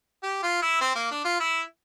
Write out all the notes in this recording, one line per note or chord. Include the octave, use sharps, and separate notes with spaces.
G4
F4
E4
C4
A#3
D4
F4
E4